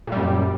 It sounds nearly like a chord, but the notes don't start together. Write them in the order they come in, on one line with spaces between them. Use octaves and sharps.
A#2 G3 F#2